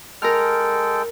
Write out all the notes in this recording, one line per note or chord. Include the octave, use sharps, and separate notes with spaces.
G#3 A4 A#4 G5 F6